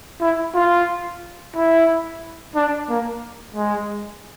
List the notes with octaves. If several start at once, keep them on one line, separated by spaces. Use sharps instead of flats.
E4
F4
E4
D4
A#3
G#3